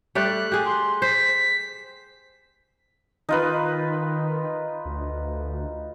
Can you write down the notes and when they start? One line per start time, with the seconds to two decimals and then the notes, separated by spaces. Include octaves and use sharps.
0.15 G3 A3 D5 F#6
0.52 G4 G#4
0.65 C6
1.02 C5 B6
3.29 D#3 D#4 F4 B4
4.85 D2